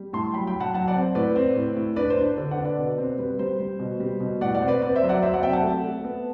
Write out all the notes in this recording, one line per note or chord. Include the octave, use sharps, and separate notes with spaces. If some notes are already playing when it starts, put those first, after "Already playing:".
Already playing: G3
A2 A5 C6
F#3 G5 B5
G5 B5
F#3
F#5 A5
F#3 F#5 A5
D5 F#5
C4
C5
A2 B4 D5
C4
A2
A2
D4 B4 D5
C5
D4
C5
D3 B4 D5
D5 F#5
D4
B4 D5
B2
C4
G3 B4
G3 C5
G3
B2
G3
B2
A2 D5 F#5
D5 F#5
C4
B4 D5
C4 B4 D5
C5 E5
F#3
D5 F#5
F#3 C5 E5
D5 F#5
C4 E5 G5
F#5 A5
A3
A3
B3